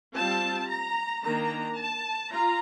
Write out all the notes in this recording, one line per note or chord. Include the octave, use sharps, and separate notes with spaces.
G3 C4 F4 A5
A#5
D#3 A#3 D4 A#5
A5
F4 A#5